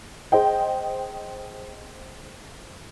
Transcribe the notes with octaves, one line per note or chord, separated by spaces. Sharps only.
G#4 C5 D#5 G5